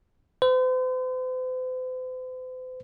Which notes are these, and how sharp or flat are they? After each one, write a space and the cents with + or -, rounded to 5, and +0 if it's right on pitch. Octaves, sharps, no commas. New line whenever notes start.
C5 -45